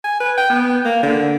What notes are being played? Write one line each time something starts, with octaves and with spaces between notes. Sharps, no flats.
G#5
B4
G5
B3
A#3
D3